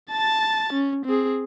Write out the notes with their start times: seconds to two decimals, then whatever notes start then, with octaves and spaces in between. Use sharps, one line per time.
0.11 A5 A6
0.73 C#4
1.05 C4 G#4